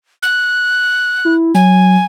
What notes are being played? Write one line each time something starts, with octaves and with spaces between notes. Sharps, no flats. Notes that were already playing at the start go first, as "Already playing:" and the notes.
F#6
E4
F#3 G#5